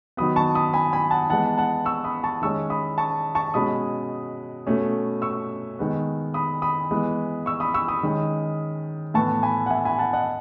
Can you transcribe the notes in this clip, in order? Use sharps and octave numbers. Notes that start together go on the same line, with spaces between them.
D#3 F#3 B3 B5 D#6
A5 C#6
B5 D#6
G#5 B5
G#5 B5
F#5 A5
E3 G#3 B3 F#5 A5
F#5 A5
C#6 E6
B5 D#6
A5 C#6
D#3 G#3 C#4 C#6 E6
B5 D#6
A5 C#6
A5 C#6
B2 G#3 C#4 B5 D#6
B2 A3 C#4
C#6 E6
D#3 G#3 B3
B5 D#6
B5 D#6
E3 G#3 B3
C#6 E6
B5 D#6
C#6 E6
B5 D#6
D#3 G#3 C#4
A2 E3 B3 A5 C#6
G#5 B5
F#5
E5 G#5
G#5 B5
F#5 A5
D#5 F#5